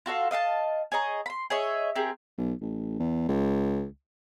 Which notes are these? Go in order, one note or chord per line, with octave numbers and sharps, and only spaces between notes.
F4 F#4 A4 F5
D#5 F5 F#5 A5
G#4 C#5 D#5 A#5
B5 C6
G#4 C#5 D#5 E5
C4 G4 G#4 A#4
B1
A1
E2
C#2